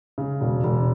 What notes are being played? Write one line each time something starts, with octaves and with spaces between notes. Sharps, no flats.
C#3
E1
E1